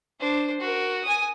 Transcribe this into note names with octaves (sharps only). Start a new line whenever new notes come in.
D4 C5
F#4 A#4
G#5 D#6